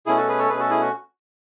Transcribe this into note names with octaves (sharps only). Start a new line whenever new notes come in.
B2 A3 C#4 E4 G#4
F#4 A4
G#4 B4
A4 C#5
B2 A3 C#4 G#4 B4
F#4 A4
E4 G#4
F#4